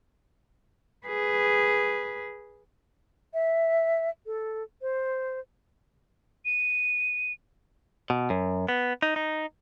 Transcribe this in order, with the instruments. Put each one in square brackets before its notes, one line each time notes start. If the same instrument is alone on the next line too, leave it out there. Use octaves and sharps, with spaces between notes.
[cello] G#4 B4
[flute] E5
A4
C5
[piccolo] D#7
[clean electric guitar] B2
F#2
B3
D#4
D#4